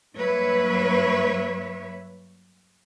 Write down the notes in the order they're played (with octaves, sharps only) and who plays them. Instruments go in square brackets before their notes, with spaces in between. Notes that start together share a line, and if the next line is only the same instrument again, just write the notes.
[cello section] G2 F#3 A#3 B4 C#5 E5